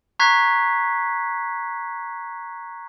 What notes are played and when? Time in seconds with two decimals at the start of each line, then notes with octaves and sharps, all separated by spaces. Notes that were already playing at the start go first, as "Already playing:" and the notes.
0.19 A#5 C#6 F#6 G#6 B6 C7